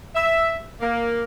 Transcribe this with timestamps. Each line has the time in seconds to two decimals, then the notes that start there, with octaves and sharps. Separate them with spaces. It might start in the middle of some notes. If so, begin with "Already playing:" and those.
0.14 E5
0.81 A#3